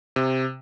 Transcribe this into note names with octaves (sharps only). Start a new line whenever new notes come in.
C3